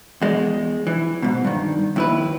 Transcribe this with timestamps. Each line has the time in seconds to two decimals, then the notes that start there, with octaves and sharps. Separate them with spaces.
0.22 E2 G#3
0.87 E3
1.22 G#2 B2
1.44 G2 D#3
1.96 D#2 E4 B4